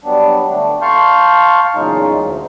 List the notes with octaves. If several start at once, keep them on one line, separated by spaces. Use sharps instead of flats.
F#3 G3 B3 D4
D3 A3 D4
F5 A5 C6 C#6 F6 G6
E2 A#2 C#3 F#3 G#3 D#4
D2